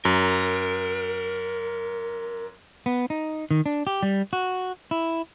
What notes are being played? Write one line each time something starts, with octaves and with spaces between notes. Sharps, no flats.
F#2 A#4
B3
D#4
D#3
D4
G4
G3
F#4
E4